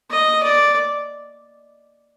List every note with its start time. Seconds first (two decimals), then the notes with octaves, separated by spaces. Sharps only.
0.11 D#5
0.43 D5